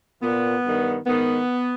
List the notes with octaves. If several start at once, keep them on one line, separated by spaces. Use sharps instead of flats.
A#2 B3
G2 D#3
G#2 D#3 B3